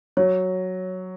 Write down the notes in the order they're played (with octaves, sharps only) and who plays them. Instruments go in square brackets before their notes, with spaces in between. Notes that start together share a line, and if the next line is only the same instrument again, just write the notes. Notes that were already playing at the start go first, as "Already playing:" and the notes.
[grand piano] F#3 [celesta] C#5